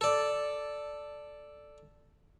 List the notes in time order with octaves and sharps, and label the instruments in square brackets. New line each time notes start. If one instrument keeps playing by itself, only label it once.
[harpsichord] A4 D5